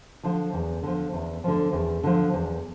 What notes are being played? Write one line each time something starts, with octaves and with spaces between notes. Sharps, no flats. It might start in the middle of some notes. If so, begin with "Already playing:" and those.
D3 F3
E2
D3 F3
E2
D3 F3
E2
D3 F3
E2